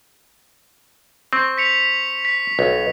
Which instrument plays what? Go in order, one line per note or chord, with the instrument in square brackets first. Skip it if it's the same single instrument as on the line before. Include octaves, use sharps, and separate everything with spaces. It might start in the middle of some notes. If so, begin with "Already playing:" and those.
[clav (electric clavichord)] C4 [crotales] C#6
[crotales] B6 C#7 F7
B6
[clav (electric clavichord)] B1